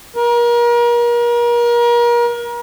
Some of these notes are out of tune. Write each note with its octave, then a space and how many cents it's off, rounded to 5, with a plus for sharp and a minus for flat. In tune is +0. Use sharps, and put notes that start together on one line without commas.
A#4 +35